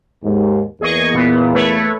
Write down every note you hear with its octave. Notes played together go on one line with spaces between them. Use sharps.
D#2 G#2
E2 A#3 G#4 D#5 C#6
A#2 B3
A3 B4 C#5